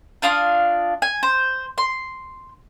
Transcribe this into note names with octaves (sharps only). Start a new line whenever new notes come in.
D4 F4 F5 D#6
G#5
C5
C6